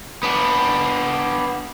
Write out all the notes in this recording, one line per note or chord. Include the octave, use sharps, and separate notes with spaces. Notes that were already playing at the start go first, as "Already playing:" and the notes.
B3 D4